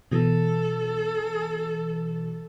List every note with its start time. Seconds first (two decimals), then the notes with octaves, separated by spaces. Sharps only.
0.12 B2 E3 A4